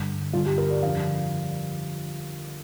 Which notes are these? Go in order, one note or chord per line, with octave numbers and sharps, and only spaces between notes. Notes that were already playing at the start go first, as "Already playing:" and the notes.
Already playing: G2 D3
G2 D3 F4
G4
A#4
D5
F2 D3 F5